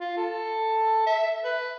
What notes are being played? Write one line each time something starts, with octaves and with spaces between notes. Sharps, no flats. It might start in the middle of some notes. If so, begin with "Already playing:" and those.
F4
A4
E5
B4